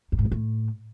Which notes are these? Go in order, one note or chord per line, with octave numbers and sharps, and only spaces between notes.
F#2
G#2
D#3
A2